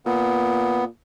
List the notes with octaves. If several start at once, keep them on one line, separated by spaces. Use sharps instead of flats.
A#2 B3